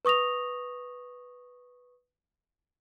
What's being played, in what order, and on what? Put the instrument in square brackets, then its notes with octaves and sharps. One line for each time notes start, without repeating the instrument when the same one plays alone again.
[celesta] B4 C#6 D#6 A#6 F7